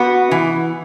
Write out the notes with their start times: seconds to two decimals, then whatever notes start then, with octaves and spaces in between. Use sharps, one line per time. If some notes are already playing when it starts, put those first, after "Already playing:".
Already playing: B3 F#4
0.31 E3